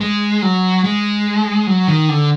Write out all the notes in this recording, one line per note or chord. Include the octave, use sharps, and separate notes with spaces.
G#3
F#3
G#3
F#3
D#3
D3